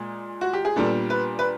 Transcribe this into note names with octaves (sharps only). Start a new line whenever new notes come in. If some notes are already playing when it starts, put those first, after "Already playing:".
Already playing: A#2 G#3
F#4
G4
G#4
A#2 G3 B3 D4 A4
B4
B4